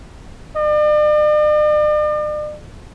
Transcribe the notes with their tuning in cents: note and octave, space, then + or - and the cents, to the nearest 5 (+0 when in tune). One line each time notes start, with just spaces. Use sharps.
D5 +45